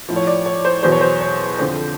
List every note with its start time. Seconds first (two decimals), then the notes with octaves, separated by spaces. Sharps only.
0.09 A2 F3
0.16 C#5
0.27 D5
0.46 C#5
0.65 C5
0.83 E2 B2 F#3 C5
0.92 C#5
1.01 C5
1.21 C#5
1.59 F2 D3 F3 C5